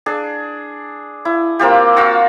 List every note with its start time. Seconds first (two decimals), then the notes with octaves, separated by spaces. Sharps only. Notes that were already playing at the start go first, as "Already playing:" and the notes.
0.06 D4 G#4
1.25 E4
1.59 A#3 C4 F4 G4
1.96 F4 F#4 F5 E6